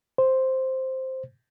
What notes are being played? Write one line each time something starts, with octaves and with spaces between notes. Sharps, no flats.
C5